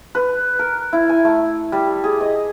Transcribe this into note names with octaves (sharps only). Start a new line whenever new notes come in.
B4
A#4
E4
G#5
A3
G3
G#4
D#5